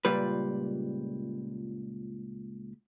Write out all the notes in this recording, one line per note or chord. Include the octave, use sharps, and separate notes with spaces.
C#2 A#2 G3 B4